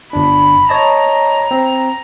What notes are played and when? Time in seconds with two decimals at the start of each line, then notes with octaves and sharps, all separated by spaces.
0.13 G1 D4 B5
0.69 C#5 D#5 A5 A#5
1.51 C4